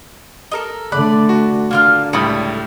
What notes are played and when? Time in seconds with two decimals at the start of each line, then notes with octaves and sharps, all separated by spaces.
0.51 A4 A#4 D#5
0.92 D3 A3 D5 B5 F#6
1.29 F#4
1.71 D3 A#3 F4 F6
2.13 C#2 A2 G3 A4 B5 D#6